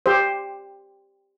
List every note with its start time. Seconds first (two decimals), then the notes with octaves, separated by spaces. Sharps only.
0.06 G4 C5